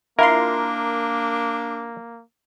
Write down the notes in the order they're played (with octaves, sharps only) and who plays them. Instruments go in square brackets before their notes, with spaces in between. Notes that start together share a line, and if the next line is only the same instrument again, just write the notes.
[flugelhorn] A#3 [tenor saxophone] D4 [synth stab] E4 F4 C6 [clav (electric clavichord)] A#4